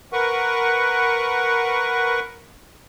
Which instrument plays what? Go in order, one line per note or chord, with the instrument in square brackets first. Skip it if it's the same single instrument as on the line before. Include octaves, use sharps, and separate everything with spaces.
[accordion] A#4 B4 F#5 C#6